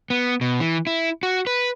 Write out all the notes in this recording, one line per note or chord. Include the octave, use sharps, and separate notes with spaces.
B3
B2
E3
E4
F#4
B4